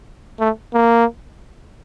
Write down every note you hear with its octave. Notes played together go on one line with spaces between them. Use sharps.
A3
A#3